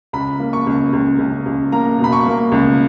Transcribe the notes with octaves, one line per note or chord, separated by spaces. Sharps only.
C#2 B5
A#3
C#6
C#2
C#2
C#2
C#2
A#3 A#5
B2
B5
C#6
A#3
C#2